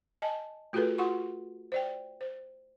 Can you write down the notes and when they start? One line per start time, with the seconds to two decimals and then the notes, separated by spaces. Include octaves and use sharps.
0.22 D#5 G#5 A5
0.73 A3 F4 F#4 G#4 A4 B4
0.98 F4 F#4 F#5 C6 C#6
1.72 C5 D5 G5
2.21 C5